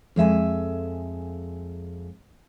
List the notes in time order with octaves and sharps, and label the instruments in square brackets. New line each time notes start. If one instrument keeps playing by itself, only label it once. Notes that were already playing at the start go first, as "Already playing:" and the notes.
[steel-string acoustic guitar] F2 G#3 E5 G#5